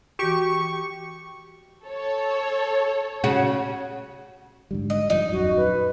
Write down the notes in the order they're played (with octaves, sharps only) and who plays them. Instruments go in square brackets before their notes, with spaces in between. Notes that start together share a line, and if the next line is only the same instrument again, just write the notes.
[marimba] E3 F#4 [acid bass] G4 [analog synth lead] C#6
[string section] A4 C#5
[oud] C#3 F#4
[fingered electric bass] G#2 D3 G3
[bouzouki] D#5
[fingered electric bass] G2 F3 [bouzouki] D#4
[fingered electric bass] D#1 F#2 F#3 [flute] F#4
[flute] B4